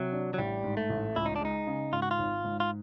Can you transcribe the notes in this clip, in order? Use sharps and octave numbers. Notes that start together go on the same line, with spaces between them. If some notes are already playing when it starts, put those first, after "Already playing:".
Already playing: C3 F#3
D4
F#3
A1 G3
G#2
A3
A1
C#2 E4
D#4
D4
G#3 D#4
C#3
G#2 F4
F#4
F4
G#1
G#2
F4